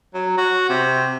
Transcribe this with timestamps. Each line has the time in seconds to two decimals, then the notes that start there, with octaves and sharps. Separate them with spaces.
0.14 F#3
0.38 F#4
0.69 C3